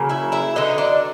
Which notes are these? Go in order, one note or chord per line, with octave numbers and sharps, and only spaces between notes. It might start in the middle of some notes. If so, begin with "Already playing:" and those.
Already playing: C#3 F#3 A#3
E4 E5
E4 E5
D3 F#3 B3 D#4 D#5
D4 D5